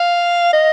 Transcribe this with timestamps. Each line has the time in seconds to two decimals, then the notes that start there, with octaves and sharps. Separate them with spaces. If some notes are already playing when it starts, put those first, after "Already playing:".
Already playing: F5
0.53 D#5